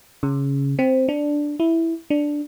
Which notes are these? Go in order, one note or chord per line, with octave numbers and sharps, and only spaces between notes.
C#3
C4
D4
E4
D4